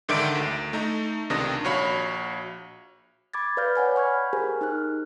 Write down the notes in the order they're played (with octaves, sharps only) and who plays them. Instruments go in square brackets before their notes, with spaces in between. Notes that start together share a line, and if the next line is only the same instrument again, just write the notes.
[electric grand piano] G#2 D3 D#3 E5 D6 D7
D2
A3 D#4 A#5
C#2 C3 D#3 D4 D#6 A#6
A#1 F#4 C#5 F5 B5
[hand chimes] B5 D6 G#6 A6
B4 D5 F5 B5 F6 G6
C#5 F#5 G#5 G6
B5 C#6 F6 G#6
G4 G#4 A#4 C5 G#5
D#4 F6 F#6